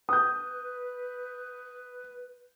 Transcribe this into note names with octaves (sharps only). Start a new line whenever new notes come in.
B4 D#6 G6